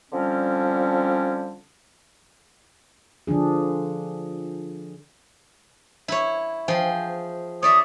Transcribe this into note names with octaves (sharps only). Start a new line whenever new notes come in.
D3 F3 G3 C4 C#4
D3 F3 D4 G#4
E4 C#5
F3 G#4 G5
C#5 D5 E5 D#6